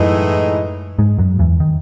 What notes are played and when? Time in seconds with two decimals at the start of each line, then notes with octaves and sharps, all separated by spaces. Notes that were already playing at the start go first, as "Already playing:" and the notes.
Already playing: F#2 A2 E3 F#3 G#3 D#4
0.98 G#2 G#3
1.18 F#2 F#3
1.39 E2 E3
1.60 D#3